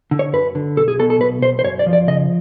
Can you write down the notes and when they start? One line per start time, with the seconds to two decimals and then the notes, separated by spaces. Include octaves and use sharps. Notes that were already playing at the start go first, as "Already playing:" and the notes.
0.11 D3
0.19 C#5
0.33 F#2 B4
0.55 D3
0.77 B1 A4
0.88 G#4
0.99 B2 A4
1.10 A4
1.21 B1 B4
1.42 B1 C5
1.59 C5
1.65 F#2 C#5
1.79 D5
1.86 F3
1.93 D5
2.08 C#3 D#5